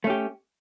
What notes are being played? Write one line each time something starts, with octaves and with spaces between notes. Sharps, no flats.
A3 C#4 G4